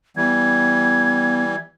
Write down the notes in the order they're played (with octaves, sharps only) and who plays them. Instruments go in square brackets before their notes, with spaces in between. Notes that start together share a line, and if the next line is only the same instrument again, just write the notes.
[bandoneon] E3 G3 [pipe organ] B3 [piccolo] G#6